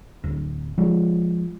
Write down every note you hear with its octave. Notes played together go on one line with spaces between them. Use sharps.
D1
F3 G#3